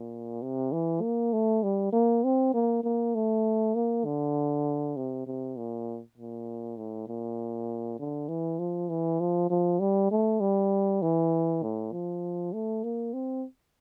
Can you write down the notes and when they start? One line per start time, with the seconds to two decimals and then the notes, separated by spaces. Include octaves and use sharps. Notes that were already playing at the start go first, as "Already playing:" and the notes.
Already playing: A#2
0.42 C3
0.72 E3
1.01 A#3
1.33 A3
1.63 G3
1.92 A#3
2.24 C4
2.54 A#3
2.83 A#3
3.15 A3
3.75 A#3
4.05 D3
4.96 C3
5.26 C3
5.57 A#2
6.17 A#2
6.77 A2
7.07 A#2
7.99 D3
8.28 E3
8.59 F3
8.89 E3
9.20 F3
9.50 F3
9.80 G3
10.11 A3
10.40 G3
11.02 E3
11.62 A2
11.92 F3
12.53 A3
12.83 A#3
13.13 C4